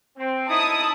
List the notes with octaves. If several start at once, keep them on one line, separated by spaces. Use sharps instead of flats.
C4
D#4 E4 A5 D#6